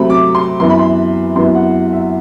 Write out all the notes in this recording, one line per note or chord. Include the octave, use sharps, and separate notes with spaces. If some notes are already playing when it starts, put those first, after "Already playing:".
Already playing: C3 F#3 A3 C4 B5
D6
C6
F#2 E3 B3 C6
B5
C6
F#2 E3 B3 C6
F#5
E5